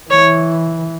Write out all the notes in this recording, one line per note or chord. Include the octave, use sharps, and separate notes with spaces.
E3 C#5